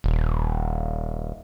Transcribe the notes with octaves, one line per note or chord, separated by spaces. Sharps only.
D#1